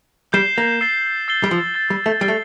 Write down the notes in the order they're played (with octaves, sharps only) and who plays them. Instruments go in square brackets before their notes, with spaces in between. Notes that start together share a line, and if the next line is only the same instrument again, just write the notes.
[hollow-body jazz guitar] G3 [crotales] G6 C7 E7 G7
[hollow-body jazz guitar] A#3
[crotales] E6 A6 C7 E7 G7
E6 A6 C7 E7 G7
[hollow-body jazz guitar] G3
F3
[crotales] A6 C7 G7
[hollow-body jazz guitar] G3
A3
[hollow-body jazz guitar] G3 [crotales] A6 C7 G7
[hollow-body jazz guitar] A3